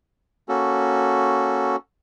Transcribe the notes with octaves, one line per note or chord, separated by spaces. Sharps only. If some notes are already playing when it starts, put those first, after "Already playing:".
A#3 C#4 F#4 A4